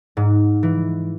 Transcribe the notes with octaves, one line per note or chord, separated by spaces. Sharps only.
G#2
E3